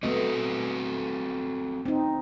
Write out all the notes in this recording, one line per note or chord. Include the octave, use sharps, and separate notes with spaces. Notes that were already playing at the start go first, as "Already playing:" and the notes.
A3 B3 C4 F#4 A4 D#5
C4 D#4